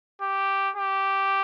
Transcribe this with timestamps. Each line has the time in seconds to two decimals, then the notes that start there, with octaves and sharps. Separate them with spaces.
0.22 G4
0.76 G4